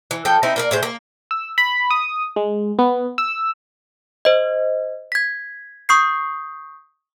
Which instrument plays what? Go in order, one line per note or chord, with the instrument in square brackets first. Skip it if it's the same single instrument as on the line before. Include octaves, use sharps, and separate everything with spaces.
[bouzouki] E3
F3 A4 G5
C4 D#4 E4
A#3 A#4 D5
A2 G#4 C5
A#3
[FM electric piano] E6
B5
D#6
G#3
B3
E6
[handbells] C5 D#5
G#6 B6
C#6 D#6 G6 C7